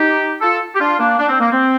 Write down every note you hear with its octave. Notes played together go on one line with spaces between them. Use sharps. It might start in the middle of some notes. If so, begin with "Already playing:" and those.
Already playing: D#4 G4
F4 A4
G4
D4 F4
A#3 D4
D4
C4
A#3
C4